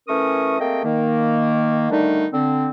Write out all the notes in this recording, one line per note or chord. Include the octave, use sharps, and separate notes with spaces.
E3 A3 C#4 A#4 C#6 D#6
A3 A#3 C4 G#4 D#5 G5
D#3 A#3
D3 D#3 G3 A3 D4 D#4
D3 C4